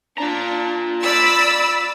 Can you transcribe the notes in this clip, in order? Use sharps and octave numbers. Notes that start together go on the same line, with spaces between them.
D4 F4 A#5
D5 B5 E6